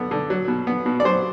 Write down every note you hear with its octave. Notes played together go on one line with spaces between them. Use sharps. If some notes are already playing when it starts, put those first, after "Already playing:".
Already playing: D3 B3
D3
F#3
B2
B3
B2
D5
F#3 C5